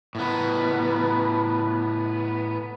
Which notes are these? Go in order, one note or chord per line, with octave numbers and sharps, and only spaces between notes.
A2 B3